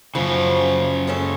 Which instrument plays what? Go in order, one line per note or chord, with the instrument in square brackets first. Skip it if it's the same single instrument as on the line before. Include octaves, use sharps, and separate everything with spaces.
[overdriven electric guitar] F#2 C#3 [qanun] F3
[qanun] G#3 C#4 A4